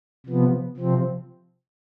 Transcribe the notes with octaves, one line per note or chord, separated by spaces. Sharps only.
C3 F3 B3
C3 F3 C4